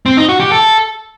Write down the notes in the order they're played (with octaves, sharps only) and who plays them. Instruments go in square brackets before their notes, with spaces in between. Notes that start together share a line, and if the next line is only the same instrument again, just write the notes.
[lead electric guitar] C4
D#4
F#4
G4
A4